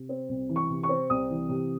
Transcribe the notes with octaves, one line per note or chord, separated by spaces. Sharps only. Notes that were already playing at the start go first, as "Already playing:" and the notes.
Already playing: C3
C4
C2
E3
C#6
C3
C#6
C4
C2 D#6
E3
C3